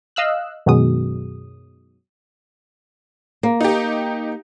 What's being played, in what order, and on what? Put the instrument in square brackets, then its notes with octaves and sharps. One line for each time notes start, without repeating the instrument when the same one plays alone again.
[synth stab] D#5 F5 E6 F#6
F#2 B2 D#3 F#3 G#3 D#6
[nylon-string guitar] A#3
[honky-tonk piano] D#4 G4